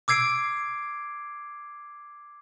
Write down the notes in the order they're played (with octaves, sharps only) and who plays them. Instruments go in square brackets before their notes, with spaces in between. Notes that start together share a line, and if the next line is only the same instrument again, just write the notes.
[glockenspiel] D6 E6 G#6 C7 D7